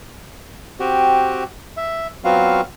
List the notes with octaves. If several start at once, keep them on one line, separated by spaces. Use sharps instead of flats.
C4 F#4 G4
E5
F#3 B3 C4 F4 F#4 F5